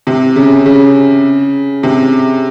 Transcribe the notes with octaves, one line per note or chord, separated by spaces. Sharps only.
C3
C#3
C#3
C3